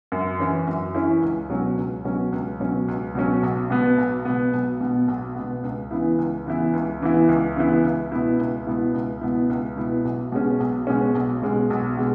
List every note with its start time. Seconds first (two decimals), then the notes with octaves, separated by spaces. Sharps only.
0.12 F#2
0.39 E3 C#4 E4
0.67 F#2
0.94 E3 C#4 E4
1.22 C#2
1.50 B2 F#3 C#4
1.77 C#2
2.05 B2 F#3 C#4
2.32 C#2
2.60 B2 F#3 C#4
2.88 C#2
3.15 B2 F#3 C#4
3.43 B1
3.70 B2 B3
3.98 B1
4.25 B2 B3
4.53 B1
4.81 B2 B3
5.08 B1
5.36 B2 B3
5.63 C#2
5.91 C#3 E3 B3 E4
6.18 C#2
6.46 C#3 E3 B3 E4
6.73 C#2
7.01 C#3 E3 B3 E4
7.29 C#2
7.56 C#3 E3 B3 E4
7.84 C#2
8.12 B2 B3 E4
8.40 C#2
8.67 B2 B3 E4
8.94 C#2
9.21 B2 B3 E4
9.50 C#2
9.77 B2 B3 E4
10.05 B1
10.32 B2 G#3 C#4
10.60 B1
10.87 B2 G#3 C#4
11.15 B1
11.42 B2 G#3 C#4
11.70 B1
11.97 B2 G#3